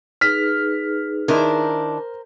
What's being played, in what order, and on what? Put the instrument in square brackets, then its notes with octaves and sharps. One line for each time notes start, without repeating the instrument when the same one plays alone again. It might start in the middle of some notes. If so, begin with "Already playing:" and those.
[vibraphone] D#4 G#4 B4 [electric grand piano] F6 B6
[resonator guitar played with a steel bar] D#3 D4 E4 [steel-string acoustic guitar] A#4 C5